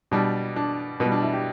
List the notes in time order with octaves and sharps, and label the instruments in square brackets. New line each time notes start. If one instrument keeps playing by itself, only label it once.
[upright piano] B2 G3 D4
D4
B2 B3
G3
D4
E4
G4